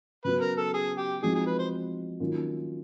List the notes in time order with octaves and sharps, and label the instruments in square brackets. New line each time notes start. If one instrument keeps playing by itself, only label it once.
[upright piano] C#3 F#3 B3 [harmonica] B4
[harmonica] A#4
A4
G#4
G4
[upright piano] F3 G#3 C4 D#4 F#4 [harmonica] G#4
[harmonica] G#4
B4
C5
[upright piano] D#3 F#3 A#3 C#4 F4